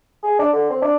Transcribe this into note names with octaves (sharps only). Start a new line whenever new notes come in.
G#4
D4
D3
C4
D4